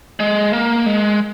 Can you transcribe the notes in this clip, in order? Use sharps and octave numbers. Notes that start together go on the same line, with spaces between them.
G#3
A#3
G#3